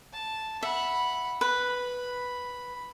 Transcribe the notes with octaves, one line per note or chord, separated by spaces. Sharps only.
A5
E5 F#5 B5
B4 B5